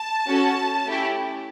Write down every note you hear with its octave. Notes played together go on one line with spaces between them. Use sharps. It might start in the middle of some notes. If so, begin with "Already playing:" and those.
Already playing: A5
C#4 F#4 A4
A3 C#4 E4 G4